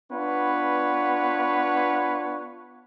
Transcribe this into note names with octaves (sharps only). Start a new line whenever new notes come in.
B3 D4 F4 B4 C#5